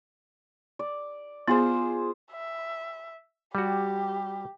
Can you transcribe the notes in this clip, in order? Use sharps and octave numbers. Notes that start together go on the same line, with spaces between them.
D5
B3 F4 G#4 C5
E5
G3 F#4 G4